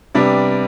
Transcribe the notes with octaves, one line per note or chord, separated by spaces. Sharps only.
C3 G3 B3 D4 D5